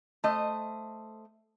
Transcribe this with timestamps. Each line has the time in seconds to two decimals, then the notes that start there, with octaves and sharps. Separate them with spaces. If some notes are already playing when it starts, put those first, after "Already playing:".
0.24 A3 C5 D#5